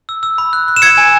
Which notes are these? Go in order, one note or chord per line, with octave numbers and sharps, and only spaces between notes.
E6
E6
B5
F#6
F#6
E7
E6 G#6 C#7
G#5